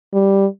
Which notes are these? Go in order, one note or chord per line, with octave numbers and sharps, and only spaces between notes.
G3